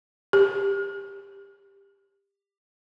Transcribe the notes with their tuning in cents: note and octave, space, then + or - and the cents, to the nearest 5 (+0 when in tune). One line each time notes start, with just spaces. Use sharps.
G4 +20